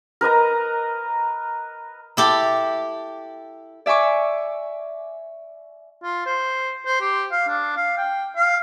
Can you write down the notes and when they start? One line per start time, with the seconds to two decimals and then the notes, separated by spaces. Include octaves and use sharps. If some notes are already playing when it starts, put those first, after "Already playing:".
0.21 A#4 B4 D#5 A#5
2.17 E4 G4 A4
3.86 D5 E5 G#5 C#6 D6
6.03 F4
6.26 C5
6.86 C5
7.01 G4
7.31 F5
7.48 D4
7.76 F5
7.97 G5
8.36 F5